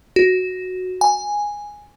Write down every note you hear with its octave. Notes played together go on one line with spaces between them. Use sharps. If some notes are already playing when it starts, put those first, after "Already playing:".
F#4
G#5